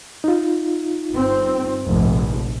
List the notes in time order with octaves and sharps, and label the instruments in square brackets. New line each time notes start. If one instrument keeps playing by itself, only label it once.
[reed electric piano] D#4 F4
[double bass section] G1 C4
F1 A#1 G#2